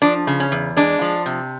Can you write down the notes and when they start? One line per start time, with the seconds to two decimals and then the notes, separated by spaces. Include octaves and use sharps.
0.02 F3 D4
0.27 C#3
0.40 C#4
0.52 E2
0.77 G#3 D4
1.01 F3
1.26 C3